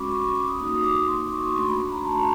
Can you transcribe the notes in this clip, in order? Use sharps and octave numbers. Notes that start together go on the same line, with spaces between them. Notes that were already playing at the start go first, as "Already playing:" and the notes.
Already playing: G#3 C#4 F#4 B5 C#6 D6
C#6
C#6
D6
D#6
A#3 D#4 F#4 D#6
D6
C6
C#6
C#6
A3 D4 F#4 C6
B5
C6
A#5
A5